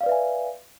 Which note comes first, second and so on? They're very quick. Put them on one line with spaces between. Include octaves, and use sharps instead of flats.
F5 D5 B4 E5 G#5